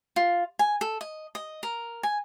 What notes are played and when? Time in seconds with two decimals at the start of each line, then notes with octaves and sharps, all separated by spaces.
0.16 F4
0.59 G#5
0.81 A4
1.01 D#5
1.35 D#5
1.63 A#4
2.03 G#5